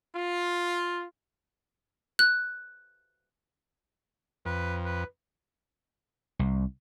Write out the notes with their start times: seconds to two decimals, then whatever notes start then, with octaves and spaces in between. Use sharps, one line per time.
0.16 F4
2.19 F#6
4.45 F2 B4
4.84 B4
6.39 C2